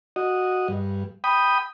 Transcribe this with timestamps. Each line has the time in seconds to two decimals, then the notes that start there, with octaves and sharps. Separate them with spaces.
0.16 F#4 D#5
0.68 G2
1.24 G5 B5 D#6